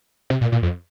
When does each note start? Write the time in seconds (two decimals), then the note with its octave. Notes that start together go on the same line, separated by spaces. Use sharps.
0.30 C3
0.41 A#2
0.52 A#2
0.63 F2